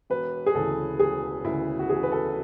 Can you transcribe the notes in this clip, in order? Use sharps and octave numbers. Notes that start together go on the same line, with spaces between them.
E1 B4
G#4
D2 C#3 E3 A4
E1 G#4
D2 C#3 E3 E4
F#4
E1 G#4
B4
A4